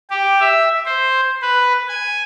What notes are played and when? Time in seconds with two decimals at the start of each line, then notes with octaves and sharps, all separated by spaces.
0.10 G4
0.41 E5
0.86 C5
1.42 B4
1.89 G#5